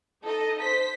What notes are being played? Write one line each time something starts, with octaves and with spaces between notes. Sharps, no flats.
D#4 A4 D#5
C5 B6